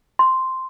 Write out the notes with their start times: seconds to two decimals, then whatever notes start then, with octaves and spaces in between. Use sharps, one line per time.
0.19 C6